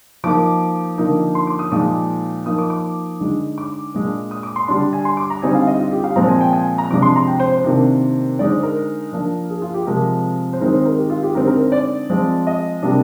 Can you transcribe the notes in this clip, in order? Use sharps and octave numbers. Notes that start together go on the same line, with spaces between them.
F3 A#3 D#4 D6
D3 F3 A#3 D#4
C6
D6
D#6
A#2 F3 G#3 D#4 D6
F3 A#3 D#4 D#6
D6
D6
D3 G#3 D#4
D6
A#2 G#3 D4
D#6
D6
C6
D3 G3 D4 C6
G#5
C6
D6
A#5
D3 G3 C4 D#4 G#5
F5
D#5
F4
G4
F5
A#2 F3 G#3 C4 A#5
G#5
G5
G#5
A#5
C3 F3 G#3 D4 D6
C6
A#5
G5
C5
C5
C3 D#3 A#3 D4
D3 G#3 D#4 D5
C5
A#4
F3 A#3 D4
G#4
F4
G4
C3 F3 G#3 C4 A#4
C5
D#3 G#3 C4 D#4 A#4
C5
A#4
G4
F4
G4
D3 G#3 C4 D#4 A#4
A#4
C5
D5
F3 G#3 C4
D#5
C3 G3 A#3 D4